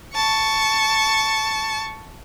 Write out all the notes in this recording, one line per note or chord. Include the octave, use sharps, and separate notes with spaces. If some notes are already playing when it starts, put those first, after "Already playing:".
A5 C#6